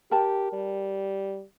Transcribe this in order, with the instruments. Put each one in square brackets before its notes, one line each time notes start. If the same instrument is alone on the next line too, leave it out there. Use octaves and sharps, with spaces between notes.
[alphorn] G4 [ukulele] A#4 G5 A5
[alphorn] G3